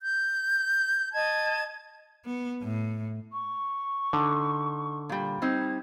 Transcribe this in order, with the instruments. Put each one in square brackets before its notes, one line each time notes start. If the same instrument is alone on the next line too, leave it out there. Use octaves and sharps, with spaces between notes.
[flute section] G6
D#5 A5 G#6
[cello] B3
A2
[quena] C#6
[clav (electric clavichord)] D3 [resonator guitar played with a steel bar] D#4
[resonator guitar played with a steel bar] A#2 G3
[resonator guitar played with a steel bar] G3 C4 D#4 [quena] G#6